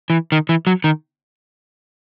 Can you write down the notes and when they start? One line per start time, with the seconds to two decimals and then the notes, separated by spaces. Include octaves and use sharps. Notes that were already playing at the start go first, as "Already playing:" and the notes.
0.10 E3
0.32 D#3
0.49 E3
0.67 F#3
0.84 D#3